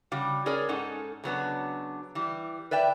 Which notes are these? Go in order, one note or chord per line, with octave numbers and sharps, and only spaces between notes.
C#3 G3 F#4
C#4 G#4 A#4 C#5 D5
G#2 C#4 D#4 A4 F#5
C#3 F#3 B3 D4
E3 G3
B4 D5 E5 G5